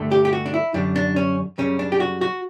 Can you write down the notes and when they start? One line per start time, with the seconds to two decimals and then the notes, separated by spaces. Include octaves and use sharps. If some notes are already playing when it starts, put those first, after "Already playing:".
Already playing: G2 D3 A3
0.12 G4
0.25 G4
0.33 F#4
0.46 D4
0.54 E4
0.74 F#2 D3 G3 D4
0.96 D4
1.16 C#4
1.58 F#2 C#3 G3 C#4
1.79 D4
1.92 G4
2.00 F#4
2.21 F#4